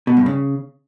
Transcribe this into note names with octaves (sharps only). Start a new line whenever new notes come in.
B2
G2
C#3